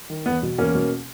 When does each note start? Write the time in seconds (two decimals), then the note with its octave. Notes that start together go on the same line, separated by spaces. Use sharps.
0.10 D#3
0.26 E2 B3
0.43 B2
0.58 E2 A#3 C#4
0.75 B2